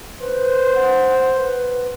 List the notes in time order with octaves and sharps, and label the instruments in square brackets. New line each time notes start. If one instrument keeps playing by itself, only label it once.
[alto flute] B4 [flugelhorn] C5
[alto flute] F#5
B4